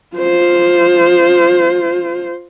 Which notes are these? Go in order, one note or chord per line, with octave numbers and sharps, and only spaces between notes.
F4 C5